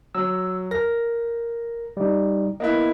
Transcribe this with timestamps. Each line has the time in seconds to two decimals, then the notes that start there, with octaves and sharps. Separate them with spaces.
0.15 F#3 E6
0.71 A#4 A#6
1.97 G3 D#4
2.60 A#3 B3 E4 D#5